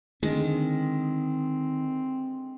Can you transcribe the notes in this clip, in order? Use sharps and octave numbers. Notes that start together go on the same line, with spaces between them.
D3 D#3 G#3 C4